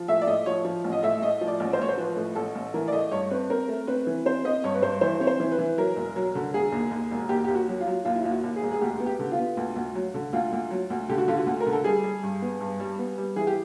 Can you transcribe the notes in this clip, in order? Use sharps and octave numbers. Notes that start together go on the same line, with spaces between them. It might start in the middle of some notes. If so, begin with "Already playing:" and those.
Already playing: F3
A2 E5
D5
A2 D#5
F3 C#5
F3
A1
D#5
A2 E5
A2 D#5
F3
D5
A1
C5
A1 C#5
C5
F3 B4
A2
A1 A4
A1
E3 A#4
D5
A3 D#5
G2 C#5
C4 B4
C4 A#4
A3
C4 B4
E3
C4 C5
C4 D#5
G2 C#5
B4
G2 C5
E3 C5
C4 C#5
C5
E3
B4
E3
F#3 A#4
E1
F#3
D3
E1 G#4
D#2
D#2
E1
D#2 G4
D#2 G4
F#4
F#3
F4
F#3
D#2 F4
E4
D#2 F4
F#4
D#2
G#4
E1
G#4
D2 G4
B3
G4
D3
F4
B3
D2
D2
F#3
D3
D2 F4
D2
F#3
D2
D3 G4
F#4
D3 F4
F#4
D2
A#4
D3
A4
G3 G#4
G3
G2
B3
G2
G3
B3
G3
E3 G#4
G4